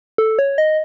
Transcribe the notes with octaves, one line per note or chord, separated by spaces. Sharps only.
A4
C#5
D#5